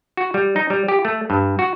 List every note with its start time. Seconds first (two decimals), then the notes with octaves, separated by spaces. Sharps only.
0.17 F#4
0.34 G3
0.56 D#4
0.70 G3
0.88 G4
1.05 A3
1.30 G2
1.59 F#4